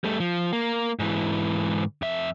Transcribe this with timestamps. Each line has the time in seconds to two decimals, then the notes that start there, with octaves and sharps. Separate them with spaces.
0.04 G3 A3
0.20 F3
0.53 A#3
0.99 G#2 E3
2.02 F2 E5